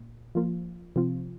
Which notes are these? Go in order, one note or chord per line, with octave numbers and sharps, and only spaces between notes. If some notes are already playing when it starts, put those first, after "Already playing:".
Already playing: A#2
F3 A#3 F4
C3 F3 C4 F4